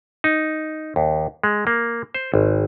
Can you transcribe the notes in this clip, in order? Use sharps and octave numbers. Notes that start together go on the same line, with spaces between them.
D#4
D#2
G#3
A#3
C5
G#1